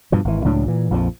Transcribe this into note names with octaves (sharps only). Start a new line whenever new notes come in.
G2 B2 F3
G#1 E3
C#2 A2 F#3 D4
A#2 E3
A#1 F2 D3 F3